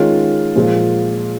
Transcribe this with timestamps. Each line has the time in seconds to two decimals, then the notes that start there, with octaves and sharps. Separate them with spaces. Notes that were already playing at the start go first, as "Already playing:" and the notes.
Already playing: D#3 G#3 C#4 F4
0.55 A#2 F3 G#3